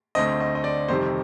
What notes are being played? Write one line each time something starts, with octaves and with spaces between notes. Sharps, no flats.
D2 D3 A3 C4 D#5
D#5
D#5
D5
F2 C3 D#3 G3 C5